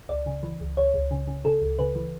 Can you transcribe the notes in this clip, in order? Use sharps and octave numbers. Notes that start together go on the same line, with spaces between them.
C#2 D5
C#3
E3
C#2
C#2 C#5
C#2
C#3
C#3
C#3 A4
C#2
C#3 B4
E3